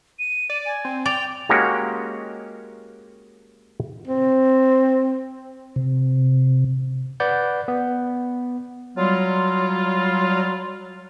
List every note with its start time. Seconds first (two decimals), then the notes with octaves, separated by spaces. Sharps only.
0.19 D#7
0.50 D5
0.66 G#5
0.85 C4
1.06 D5 G5 F7
1.49 G#3 A#3 C#4 F#4 G4
4.07 C4
5.76 C3
7.20 B4 D5 F#5 G6
7.68 B3
8.97 F#3 G3 F4